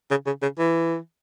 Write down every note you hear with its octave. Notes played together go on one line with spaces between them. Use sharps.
C#3
C#3
C#3
E3